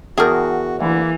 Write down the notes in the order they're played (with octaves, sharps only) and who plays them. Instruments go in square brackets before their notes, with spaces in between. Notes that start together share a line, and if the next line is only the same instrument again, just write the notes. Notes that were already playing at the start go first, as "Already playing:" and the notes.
[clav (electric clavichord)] E2 G5 A5 [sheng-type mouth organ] F#4 [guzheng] G#4 A#4
[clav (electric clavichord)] D2 [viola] E3 [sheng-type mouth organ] A#3